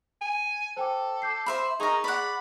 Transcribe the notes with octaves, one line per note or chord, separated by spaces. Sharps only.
G#5
A4 C5 G5 D6
D6 G6 C7
C5 E5 B5
D#4 G#4 A#4 G#5 C#6
D5 F#5 B5